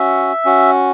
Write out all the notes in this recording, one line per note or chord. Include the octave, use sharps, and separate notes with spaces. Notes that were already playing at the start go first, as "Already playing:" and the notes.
Already playing: C#4 F#4 E5
C#4 F#4